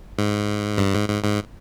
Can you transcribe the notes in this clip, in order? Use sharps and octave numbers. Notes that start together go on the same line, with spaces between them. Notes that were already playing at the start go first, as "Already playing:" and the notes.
G#2
G2
G#2
G#2
G#2